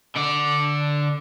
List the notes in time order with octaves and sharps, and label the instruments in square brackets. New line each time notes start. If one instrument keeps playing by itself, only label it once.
[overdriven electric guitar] D3 D5